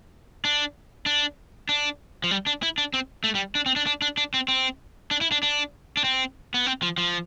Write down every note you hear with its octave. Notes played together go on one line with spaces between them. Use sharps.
D4
D4
D4
F3
G3
D4
E4
D4
C4
A3
G3
D4
C4
D4
D4
D4
D4
C4
C4
D4
E4
D4
D4
D4
C4
B3
C4
F3
F3